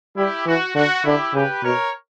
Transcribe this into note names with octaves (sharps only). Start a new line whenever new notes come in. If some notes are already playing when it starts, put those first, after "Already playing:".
G3 E4 G4
E3 F#4
D3 F#4
D3 E4 G4
C#3 G4 B4
B2 A#4 C#5